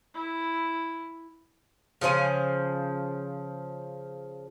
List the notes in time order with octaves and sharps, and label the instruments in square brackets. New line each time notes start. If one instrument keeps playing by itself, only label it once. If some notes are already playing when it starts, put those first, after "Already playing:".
[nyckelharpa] E4
[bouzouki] C#3 F3 C5 G#5